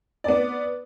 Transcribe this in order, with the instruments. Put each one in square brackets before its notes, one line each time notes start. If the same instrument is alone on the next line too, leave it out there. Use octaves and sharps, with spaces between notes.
[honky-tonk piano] B3 D5